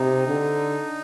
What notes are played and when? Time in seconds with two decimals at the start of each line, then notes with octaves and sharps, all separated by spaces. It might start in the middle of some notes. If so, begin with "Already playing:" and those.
Already playing: C3 D#4
0.27 D3